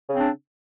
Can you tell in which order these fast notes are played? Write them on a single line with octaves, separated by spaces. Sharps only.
C#3 C4 D4